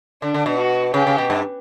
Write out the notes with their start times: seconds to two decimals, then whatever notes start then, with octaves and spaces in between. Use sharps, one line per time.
0.22 D3 D4
0.34 D3
0.46 B2
0.58 F#4
0.94 C#3 G4
1.07 C#3
1.18 B2
1.30 G2